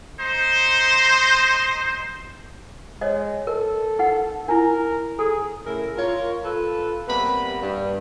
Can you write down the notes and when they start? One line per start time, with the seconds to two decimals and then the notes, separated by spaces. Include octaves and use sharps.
0.19 D#4 C5
3.01 G#3 C#5 D#5
3.47 A4 A#4
3.99 D#4 F#5
4.48 D4 E4 A#4
5.19 G#4 A4
5.65 A2 C#3 E4 G#4 A#4
5.96 F4 A#4 C#5
6.43 F4 A4 B4
7.07 C3 G3 A#3 B3 B4 B5
7.60 G2